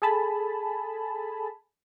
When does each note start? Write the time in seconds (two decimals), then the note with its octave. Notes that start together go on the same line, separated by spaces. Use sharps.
0.02 G#4 A4 G#5 A5 B5